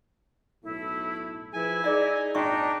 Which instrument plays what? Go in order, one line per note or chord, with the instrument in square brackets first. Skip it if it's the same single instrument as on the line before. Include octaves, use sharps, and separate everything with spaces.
[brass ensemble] B1 A2 A3 [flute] E4
[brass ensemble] F3 G#4 B4 [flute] E4 [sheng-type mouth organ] G#5
[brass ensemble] D#4 [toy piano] G#4 D5 E5
[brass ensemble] G#1 A#2 [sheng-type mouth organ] D4 D#4 [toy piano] F#4 E5 C#6 [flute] G5